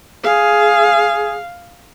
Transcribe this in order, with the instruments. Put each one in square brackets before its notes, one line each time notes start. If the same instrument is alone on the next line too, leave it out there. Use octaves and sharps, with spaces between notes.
[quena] G#4 [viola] F5